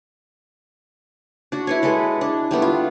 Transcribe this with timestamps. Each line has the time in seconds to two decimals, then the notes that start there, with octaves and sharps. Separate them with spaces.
1.52 D4 F#4
1.67 E4 B4 C#5
1.82 G#3 A4 B4 C6
2.21 D4
2.51 G3 A3 B3 D4
2.62 F4